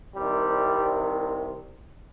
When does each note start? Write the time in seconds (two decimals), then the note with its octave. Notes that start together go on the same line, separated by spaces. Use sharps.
0.14 C2 C3 D#3 G3